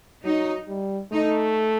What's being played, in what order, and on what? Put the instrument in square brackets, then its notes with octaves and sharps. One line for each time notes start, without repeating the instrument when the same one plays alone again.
[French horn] F#3 [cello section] D#4
[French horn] G3
[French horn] A3 [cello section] D#4